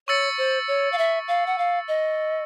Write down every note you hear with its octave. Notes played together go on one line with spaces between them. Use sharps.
C#5 C#6 E6 A6 C#7
C5
C#5
F5
E5
F5
F#5
F5
D#5